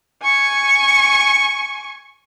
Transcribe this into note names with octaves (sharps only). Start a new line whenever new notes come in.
G#5 C#6